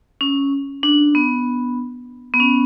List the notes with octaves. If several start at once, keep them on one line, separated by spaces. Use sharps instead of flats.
C#4
D4
B3
B3
C#4